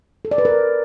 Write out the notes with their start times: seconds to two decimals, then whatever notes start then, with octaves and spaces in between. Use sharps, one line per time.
0.25 A4
0.31 D5
0.38 B4
0.45 A#4